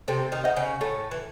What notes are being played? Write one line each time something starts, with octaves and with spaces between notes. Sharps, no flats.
C3 C4 A4
D#3 D#4
D#4 C5 D#5 F#5
C#3 C#4
A2 A3 A4
E3